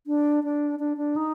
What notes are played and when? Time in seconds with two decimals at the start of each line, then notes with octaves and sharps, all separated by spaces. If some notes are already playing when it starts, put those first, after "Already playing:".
0.07 D4
0.44 D4
0.79 D4
0.97 D4
1.16 D#4